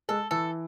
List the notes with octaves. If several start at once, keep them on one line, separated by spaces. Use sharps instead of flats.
G#3 A4
E3 A4